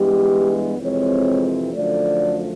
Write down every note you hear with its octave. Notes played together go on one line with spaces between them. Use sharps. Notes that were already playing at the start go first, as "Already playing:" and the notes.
Already playing: G2 E3 G#3 B3 G4
F2 C3 E3 G#3 C4 C#5
F#2 D3 F3 A3 D5